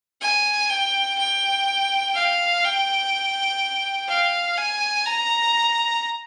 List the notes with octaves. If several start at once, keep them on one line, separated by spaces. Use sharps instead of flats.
G#5
G5
G5
F5
G5
F5
G#5
A#5